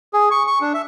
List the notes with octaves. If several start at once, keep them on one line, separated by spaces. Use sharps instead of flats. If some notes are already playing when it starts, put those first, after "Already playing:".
G#4
C#6
C#6
D4
E5